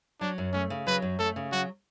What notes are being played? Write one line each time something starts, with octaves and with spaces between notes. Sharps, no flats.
F#3 D4
F#2
A3 C#4
C#3
F#3 B4
F#2
A3 A4
C#3
F#3 F#4